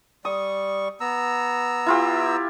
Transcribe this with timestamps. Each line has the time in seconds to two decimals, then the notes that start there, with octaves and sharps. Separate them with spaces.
0.25 G3 C#6 D#6
1.00 B3 A#5 E6
1.86 E4 F4 G4